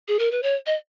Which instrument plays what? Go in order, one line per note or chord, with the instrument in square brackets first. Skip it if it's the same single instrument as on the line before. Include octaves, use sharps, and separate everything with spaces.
[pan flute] G#4
A#4
B4
C#5
D#5